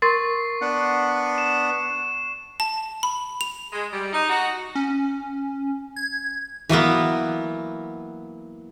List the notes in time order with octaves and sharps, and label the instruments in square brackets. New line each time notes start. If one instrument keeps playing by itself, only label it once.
[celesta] A#4 C6 A6 [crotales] C#6 C7
[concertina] B3 D4 F#5
[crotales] E7
[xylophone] A5
B5
F7
[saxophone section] G#3
G3
D#4
F#4
[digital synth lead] C#4
G#6
[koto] E3 F#3 A#3 B3